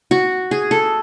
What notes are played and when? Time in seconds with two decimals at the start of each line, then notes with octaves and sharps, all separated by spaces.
0.11 F#4
0.51 G#4
0.71 A4